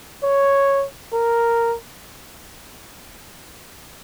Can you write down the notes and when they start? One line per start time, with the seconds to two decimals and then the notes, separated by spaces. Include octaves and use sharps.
0.23 C#5
1.13 A#4